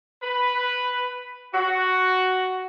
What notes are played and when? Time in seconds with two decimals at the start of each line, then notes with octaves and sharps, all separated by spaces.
0.22 B4
1.54 F#4